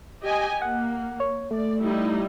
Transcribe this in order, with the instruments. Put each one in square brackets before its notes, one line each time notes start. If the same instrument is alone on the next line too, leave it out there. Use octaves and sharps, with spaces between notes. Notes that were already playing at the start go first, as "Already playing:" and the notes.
[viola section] G4 D#5 G#5
[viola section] A#3 [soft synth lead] F#5
[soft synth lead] C#5
[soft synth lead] A3 [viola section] D5
[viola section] G3 D#4 E4